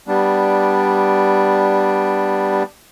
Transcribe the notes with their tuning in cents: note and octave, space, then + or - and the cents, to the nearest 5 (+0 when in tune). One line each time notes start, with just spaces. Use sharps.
G3 +0 B3 +0 D4 +0